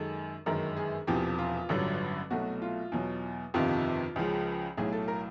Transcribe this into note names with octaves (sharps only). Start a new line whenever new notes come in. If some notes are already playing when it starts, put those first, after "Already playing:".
Already playing: F#2 D#3 G#3 A4
G1 F#2 D#3 G#3 A#4
G#4
E1 E2 C3 F3 G4
F4
A1 G2 D3 F#3
C2 B2 F#3 A3 F#4
F4
E2 B2 F#3
G1 F2 C3 D#3 F4
C#2 C#3 F3 G#3
B1 A2 F#3 G#4
A4
A#4